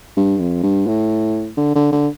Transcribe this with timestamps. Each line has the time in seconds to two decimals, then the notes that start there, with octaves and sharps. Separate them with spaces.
0.17 G2
0.40 F2
0.63 G2
0.87 A2
1.57 D3
1.75 D3
1.92 D3